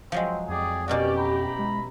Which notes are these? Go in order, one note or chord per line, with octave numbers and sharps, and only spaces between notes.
F3 F#3 G#3 C4
F2 G4 G#4 D5
B2 C#4 F#4 G4 A#4 D5
E4 A#5 B5
G#3